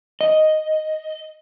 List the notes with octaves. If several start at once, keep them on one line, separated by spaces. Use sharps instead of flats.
D#5